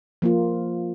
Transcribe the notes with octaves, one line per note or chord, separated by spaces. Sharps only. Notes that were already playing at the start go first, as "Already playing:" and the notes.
F3 A#3 F4